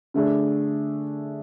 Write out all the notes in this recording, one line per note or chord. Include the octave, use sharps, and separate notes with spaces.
D3 A3 D4 G#4